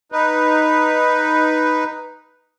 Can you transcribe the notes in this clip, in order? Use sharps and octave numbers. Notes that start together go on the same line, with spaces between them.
D#4 B4